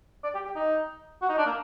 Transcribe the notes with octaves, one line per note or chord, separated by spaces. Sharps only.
D5
G4
G4
D#4
F#4
D#4
D4
A#3